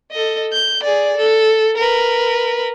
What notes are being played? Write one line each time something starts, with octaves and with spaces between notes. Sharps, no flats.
A4 D#5
G6
G#4 D5
A4
A#4 B4